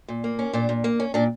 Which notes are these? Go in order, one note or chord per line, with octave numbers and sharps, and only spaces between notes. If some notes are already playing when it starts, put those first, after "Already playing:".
A#2
A#3
C#4
A#2 D4
A#2
A#3
C#4
A#2 D4